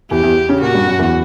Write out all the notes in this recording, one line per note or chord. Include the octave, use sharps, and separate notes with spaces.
E2 E3 G4
E2 E3
C#3 C#4
A#2 A#3 F#4
G2 G3
F#2 F#3
E2 E3